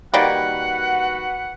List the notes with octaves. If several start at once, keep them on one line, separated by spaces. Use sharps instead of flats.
D#3 G3 A#3 F#4 B4 F#5